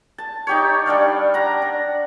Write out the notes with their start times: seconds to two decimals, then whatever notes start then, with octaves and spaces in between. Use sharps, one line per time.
0.18 A5
0.47 D#4 G4 C#5
0.86 G3 D4 D5 F5
1.34 F#5 A#5
1.62 D4